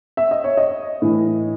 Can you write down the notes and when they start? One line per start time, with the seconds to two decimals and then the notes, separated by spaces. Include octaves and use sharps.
0.17 E5
0.31 D#5
0.44 C#5
0.57 D#5
1.02 A2 E3